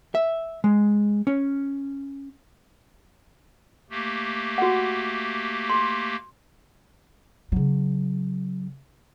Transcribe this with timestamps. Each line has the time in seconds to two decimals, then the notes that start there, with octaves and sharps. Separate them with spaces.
0.15 E5
0.64 G#3
1.27 C#4
3.90 A3 A#3 G4
4.58 F#4 F#5
5.70 C6
7.52 C#3 F#3